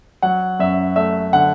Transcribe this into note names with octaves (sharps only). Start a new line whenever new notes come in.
F#3 F#5
F#2 E5
A3 E5
D3 F#5